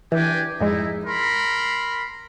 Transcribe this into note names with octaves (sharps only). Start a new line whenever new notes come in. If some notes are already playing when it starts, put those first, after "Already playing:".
E3 D4 G4 G#5
F2 G#2 G#3 D#4 E4
A#4 B5 C6